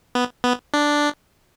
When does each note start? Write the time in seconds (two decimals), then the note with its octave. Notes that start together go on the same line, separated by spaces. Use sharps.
0.15 B3
0.44 B3
0.74 D4